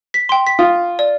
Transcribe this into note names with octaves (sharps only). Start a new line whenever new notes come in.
B6
G5 C6
B6
F4 D#6
D5